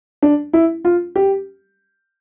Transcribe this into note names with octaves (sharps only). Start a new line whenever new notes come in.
D4
E4
F4
G4